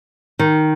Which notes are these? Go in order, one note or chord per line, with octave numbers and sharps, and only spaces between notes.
D#3